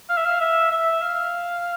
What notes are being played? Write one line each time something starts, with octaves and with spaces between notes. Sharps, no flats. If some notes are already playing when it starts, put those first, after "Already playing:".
F5
E5
F5
E5
E5
F5